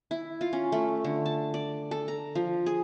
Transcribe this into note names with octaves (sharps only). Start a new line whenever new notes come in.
E4
F4
C#4
A3
D3
A5
D5
A4
A#5
F3
G#4